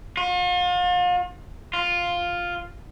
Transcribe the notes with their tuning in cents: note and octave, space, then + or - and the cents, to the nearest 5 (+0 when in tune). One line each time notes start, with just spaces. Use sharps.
F4 +40
F4 +5